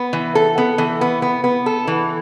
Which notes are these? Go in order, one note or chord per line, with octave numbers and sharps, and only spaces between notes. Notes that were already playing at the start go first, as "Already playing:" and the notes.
Already playing: B3
E3
A4
B3
E3
B3
B3
B3
A4
E3